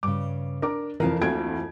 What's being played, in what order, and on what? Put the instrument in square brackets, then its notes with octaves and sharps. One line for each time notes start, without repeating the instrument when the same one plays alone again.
[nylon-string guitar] G2 C#3 [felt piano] D6
[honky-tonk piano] D4 [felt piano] A#4 D6
[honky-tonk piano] F2 E3 [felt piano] F3 A#4 [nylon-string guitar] B4 F5 A5
[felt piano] D2 G#6 D7 [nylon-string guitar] A#3 A4 B4